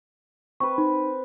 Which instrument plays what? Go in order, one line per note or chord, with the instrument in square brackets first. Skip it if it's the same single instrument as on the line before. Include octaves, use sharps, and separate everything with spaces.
[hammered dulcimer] C4 B4 [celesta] C#6
[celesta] D#4